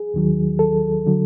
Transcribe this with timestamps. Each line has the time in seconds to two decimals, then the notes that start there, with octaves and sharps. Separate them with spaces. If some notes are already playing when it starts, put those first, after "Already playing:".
Already playing: G#4
0.14 D#2 D#3 F#3
0.59 A4
1.07 D3 F#3